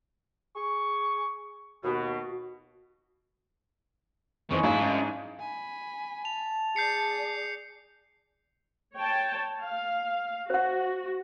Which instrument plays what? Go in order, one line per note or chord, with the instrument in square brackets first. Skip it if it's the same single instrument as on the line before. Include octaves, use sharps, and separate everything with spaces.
[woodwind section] G#4 C#6
[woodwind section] D#2 B2 [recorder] F#4
[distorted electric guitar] E2 D#3 [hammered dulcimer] E3 G#3 C#6 [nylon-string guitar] C4 B4 C5
[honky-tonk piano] G#2 D4 [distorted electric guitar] E4 [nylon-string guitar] F5
[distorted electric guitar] F#2
[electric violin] G#5 B5
[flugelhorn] A5 [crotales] F7
[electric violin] G#4 D5 [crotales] G6 C7 C#7
[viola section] C#5 G5 A5
F5
[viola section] F#4 [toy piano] C5 F#5